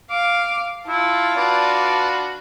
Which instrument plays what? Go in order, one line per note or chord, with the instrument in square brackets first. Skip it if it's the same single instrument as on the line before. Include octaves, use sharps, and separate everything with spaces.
[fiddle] F5 [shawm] D6
[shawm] E4 [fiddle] F4 A5
[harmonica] D4 F#4 B4 [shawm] D5